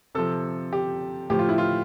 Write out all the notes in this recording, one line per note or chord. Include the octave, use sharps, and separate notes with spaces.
C3 F3 A4
G4
A2 F3 G4
F4
E4
F4